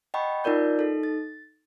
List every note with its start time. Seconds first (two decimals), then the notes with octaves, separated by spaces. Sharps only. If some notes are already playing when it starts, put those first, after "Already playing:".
0.14 D#5 F#5 G5 A5 B5 C#6
0.44 D#4 F4 A#4 D5 G6
0.79 D#4 A4
1.03 A6